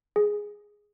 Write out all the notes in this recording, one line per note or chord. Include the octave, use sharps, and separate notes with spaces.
G#4